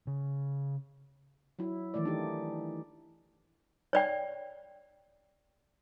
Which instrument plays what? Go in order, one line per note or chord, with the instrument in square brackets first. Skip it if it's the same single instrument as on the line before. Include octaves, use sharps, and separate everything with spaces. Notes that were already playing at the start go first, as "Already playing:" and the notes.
[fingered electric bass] C#3
[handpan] F#3 E4
D#3 E3 A3 D5
D4 D#4 G4
[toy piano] C#5 D5 G5